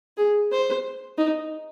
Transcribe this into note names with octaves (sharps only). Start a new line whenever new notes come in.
G#4
C5
D#4